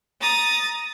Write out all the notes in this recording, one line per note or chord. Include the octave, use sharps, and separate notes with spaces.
A#5 D#6 A6